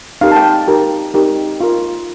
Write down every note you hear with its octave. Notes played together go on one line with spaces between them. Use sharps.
D#4 G4 A#4 F5
A5
G5
D#4 G4 A#4
D#4 G4 A#4
F4 A#4